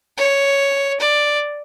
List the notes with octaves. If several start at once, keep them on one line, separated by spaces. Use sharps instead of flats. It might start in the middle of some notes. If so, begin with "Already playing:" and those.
C#5
D5